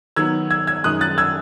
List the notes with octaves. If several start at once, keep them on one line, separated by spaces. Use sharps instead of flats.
D#3 F#3 B3 E6 G#6
E6 G#6
E6 G#6
F#2 D#3 G#3 D#6 F#6
F#6 A6
E6 G#6